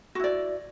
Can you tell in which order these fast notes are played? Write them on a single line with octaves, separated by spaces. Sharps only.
F#4 E4 D5